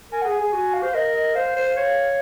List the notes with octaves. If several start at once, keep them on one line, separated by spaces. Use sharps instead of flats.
A#4 G#5
G#4 F#5
G#5
G#4
F#4 G#5
F5
C5
A#4 D#5
D#5
C5 F5
C5
C#5